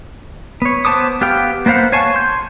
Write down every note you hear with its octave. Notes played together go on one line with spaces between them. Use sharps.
B3 C#5
B3 C5 A5 D6 D#6
B3 G4 F5 G5
A#3 B3 C5 F5 F#5
C#5 F5 G#5 A5 C#6
C6 G6